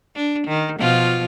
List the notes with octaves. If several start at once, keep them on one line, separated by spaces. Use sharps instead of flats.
D4
D#3
B2 F3 F4